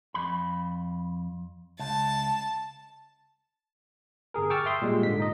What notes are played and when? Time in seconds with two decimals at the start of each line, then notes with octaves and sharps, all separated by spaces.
0.14 F2 B5
1.79 C#2 A5
4.34 G1 G#4 A#4
4.50 G5 C#6 D6 E6 F6 A6
4.66 E5 G5 C6 D#6
4.82 A#2 G3 G#3
5.03 G#2 D3 B6
5.19 D#4 D#5